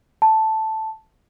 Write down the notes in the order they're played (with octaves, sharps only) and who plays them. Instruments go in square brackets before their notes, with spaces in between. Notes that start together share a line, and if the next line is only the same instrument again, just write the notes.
[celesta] A5